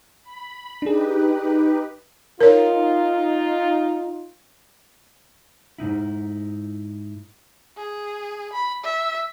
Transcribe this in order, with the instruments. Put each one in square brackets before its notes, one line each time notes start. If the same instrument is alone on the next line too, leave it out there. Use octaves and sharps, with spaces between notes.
[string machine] B5
[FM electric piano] D4 G#4 [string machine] D#4 G4 B4
[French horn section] D#4 F4 [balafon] A#4 C#5
[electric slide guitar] G#2 B2 D#4 E4
[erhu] G#4
B5
E5